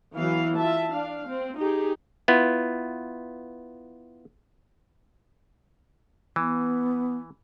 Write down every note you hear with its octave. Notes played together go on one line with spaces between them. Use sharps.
E3 F#3 B3 F5
F4 E5 A5
D4 F5
C4
D#4 G4 G#4
B3 E4 F4
E3 B3